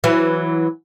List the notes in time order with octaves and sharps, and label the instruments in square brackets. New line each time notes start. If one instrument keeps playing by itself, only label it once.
[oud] E3 F#3